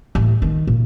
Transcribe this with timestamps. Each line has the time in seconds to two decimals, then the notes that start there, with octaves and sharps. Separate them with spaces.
0.15 A1
0.42 D#3
0.67 A#2